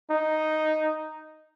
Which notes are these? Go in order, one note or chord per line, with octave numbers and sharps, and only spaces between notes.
D#4